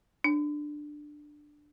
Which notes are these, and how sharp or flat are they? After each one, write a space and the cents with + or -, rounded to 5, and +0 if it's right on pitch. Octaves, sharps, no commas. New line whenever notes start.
D4 +15